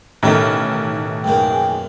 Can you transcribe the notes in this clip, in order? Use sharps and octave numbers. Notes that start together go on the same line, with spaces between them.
A1 B2 D#3 D#4 E4 A4
B1 F#2 A#3 G#4 G5